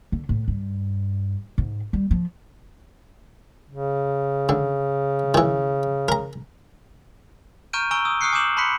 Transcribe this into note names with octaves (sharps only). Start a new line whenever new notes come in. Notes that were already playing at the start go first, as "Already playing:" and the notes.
D3
A2
G2
G#2
G3
F3
C#3
D3
D#3 E3
A#4 A#5
A#5 C#6 F6 G6 D7 D#7
G#5 A#5 C#6 E6 D7 G7
D#6 E6
C#6 D#6 F6 F#6 C7 C#7
G#5 D6 D#6 G6 E7 F#7
A5 B5 C6 F#6 B6 C#7